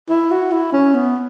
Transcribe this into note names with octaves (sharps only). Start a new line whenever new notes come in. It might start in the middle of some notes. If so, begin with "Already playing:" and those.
E4
F#4
E4
C#4
B3